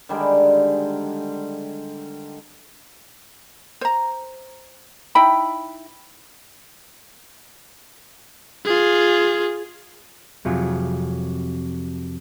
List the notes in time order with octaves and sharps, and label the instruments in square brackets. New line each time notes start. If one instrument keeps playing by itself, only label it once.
[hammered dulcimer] D3 D#3 G3 G#3
[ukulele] C5 A#5
D#4 E4 G5 B5
[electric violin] F4 G#4
[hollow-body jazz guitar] F2 C3 F#3 F4 G#4